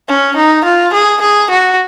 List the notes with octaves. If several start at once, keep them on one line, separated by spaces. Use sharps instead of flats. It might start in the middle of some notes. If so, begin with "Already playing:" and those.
C#4
D#4
F4
G#4
G#4
F#4